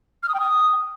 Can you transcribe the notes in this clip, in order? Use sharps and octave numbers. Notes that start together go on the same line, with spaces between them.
F6
D#6
G5
D#6